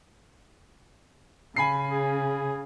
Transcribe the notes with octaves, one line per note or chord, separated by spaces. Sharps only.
C#3 G#5 B5 C7
G#4